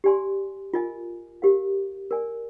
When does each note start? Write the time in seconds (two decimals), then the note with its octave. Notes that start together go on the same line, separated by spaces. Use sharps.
0.04 G4 D5 G#5 C6
0.74 F4 A#4 D#5 G#5
1.42 G4 A#4 F5
2.11 A#4 D5 G#5